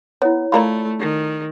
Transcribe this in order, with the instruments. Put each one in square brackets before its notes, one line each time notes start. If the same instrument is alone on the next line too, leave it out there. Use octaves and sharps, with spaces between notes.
[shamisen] B3 [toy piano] E4 C#5
[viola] A3 [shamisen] F4 A#4 A#5 [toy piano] D5 B5
[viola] D#3